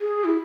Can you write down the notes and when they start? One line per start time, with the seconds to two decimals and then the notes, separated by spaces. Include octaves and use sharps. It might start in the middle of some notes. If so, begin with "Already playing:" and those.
0.01 G#4
0.25 E4